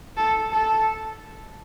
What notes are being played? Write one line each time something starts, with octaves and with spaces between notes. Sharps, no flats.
A4
A4